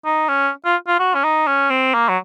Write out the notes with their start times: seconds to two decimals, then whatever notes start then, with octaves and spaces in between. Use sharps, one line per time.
0.05 D#4
0.29 C#4
0.65 F4
0.88 F4
0.99 F#4
1.14 C#4
1.24 D#4
1.47 C#4
1.70 C4
1.94 A#3
2.09 F#3